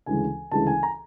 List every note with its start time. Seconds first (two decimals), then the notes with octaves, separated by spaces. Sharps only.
0.06 D2 C#3 E3 G#3 G#5
0.51 D2 C#3 E3 G#3 A5
0.67 G#5
0.83 A#5